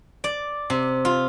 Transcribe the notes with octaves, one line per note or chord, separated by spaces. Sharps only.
D5
C3
F4